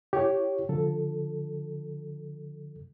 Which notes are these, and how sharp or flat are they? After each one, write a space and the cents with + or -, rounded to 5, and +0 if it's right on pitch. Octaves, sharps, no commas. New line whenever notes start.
E4 +15 G4 -10 C#5 +0
D3 +0 F3 +15 A4 +0